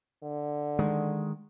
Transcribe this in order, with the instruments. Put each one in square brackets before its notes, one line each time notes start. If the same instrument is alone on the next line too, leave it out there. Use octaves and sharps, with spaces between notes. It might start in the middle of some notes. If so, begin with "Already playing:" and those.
[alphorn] D3
[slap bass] D#3 G#3